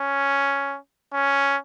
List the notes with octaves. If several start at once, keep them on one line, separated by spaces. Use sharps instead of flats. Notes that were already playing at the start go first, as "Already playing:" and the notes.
Already playing: C#4
C#4